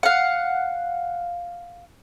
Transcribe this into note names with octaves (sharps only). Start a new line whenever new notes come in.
F5 F#5